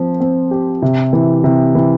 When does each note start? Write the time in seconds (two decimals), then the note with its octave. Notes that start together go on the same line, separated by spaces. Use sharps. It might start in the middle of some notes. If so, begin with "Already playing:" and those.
Already playing: F3 C4
0.20 C4
0.51 G4
0.82 C3
1.13 E3
1.44 C3
1.75 E3